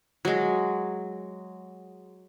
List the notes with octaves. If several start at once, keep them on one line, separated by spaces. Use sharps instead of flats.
F#3 G#3